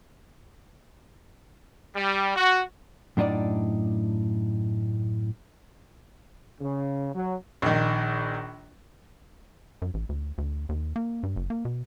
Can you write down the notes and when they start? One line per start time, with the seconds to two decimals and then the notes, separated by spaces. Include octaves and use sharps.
1.96 G3
2.36 F#4
3.17 F#2 A2 D4 D#4 D5
6.60 C#3
7.15 F#3
7.62 A#1 D#3
9.82 F#2
9.94 A1
10.09 D2
10.38 D2
10.69 D#2
10.96 A#3
11.23 G2
11.36 F#1
11.50 A#3
11.65 B2